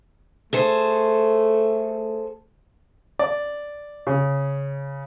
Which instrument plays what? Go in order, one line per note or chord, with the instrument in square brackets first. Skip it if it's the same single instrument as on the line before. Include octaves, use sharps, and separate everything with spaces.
[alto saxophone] A3 [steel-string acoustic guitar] G#4 A4 C5
[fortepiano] D5
C#3